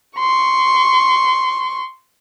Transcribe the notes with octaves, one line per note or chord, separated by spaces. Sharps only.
C6 C#6